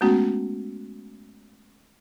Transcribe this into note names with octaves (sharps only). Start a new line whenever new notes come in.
G#3 A3 B3 C#4 F#4